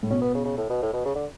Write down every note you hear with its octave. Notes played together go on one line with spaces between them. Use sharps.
A2
B2 C#4
B3
C#3
C#3
A2
B2
A2
B2
C#3
D3